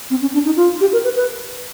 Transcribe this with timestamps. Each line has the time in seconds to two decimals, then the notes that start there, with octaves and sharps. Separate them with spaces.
0.10 C4
0.21 C#4
0.34 D4
0.45 D#4
0.56 F4
0.81 G4
0.93 A#4
1.04 B4
1.16 B4